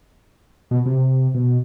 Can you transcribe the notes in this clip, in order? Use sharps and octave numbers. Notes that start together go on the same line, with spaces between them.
B2
C3
B2